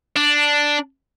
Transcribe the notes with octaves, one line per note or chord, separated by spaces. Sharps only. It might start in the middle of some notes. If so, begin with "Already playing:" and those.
D4